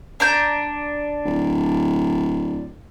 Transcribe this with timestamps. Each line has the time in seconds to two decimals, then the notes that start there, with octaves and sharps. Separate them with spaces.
0.20 D4 A#5 G6
1.26 D1